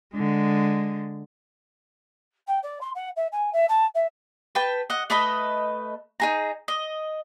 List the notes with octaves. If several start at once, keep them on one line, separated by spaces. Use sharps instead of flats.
D3 G#3
G5
D5
C6
F#5
E5
G#5
E5
A5
E5
B4 G5 A5
D#5 F#5
A3 B4 D#5 B5
D#4 G#4 A#5
D#5